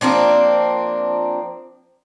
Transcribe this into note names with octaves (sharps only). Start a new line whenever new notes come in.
F3 A#3 C4 D4